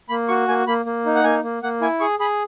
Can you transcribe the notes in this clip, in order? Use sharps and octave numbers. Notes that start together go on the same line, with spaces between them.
A#3 B5
F#4 C#6
A#3 G#5
A#3 B5
A#3
D#4
F#5
A#3 G#5
A#3
A#3 F#5
E4 G#5
G#4 C#6
G#4 B5